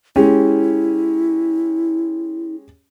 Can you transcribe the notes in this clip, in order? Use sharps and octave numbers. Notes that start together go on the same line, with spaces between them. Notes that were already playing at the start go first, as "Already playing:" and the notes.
G#3 C#4 E4 G4